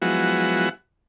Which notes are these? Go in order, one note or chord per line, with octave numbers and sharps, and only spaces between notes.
F3 F#3 G#3 B3 E4 F#4